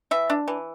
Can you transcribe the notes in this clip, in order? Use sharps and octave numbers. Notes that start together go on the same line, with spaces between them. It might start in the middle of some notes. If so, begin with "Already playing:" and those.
E3 E5
D4
E3